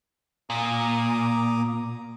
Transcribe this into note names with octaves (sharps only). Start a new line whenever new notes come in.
A#2 A#5 D6 D#6